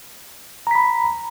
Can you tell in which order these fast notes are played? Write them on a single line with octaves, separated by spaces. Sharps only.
A#5 B6 B5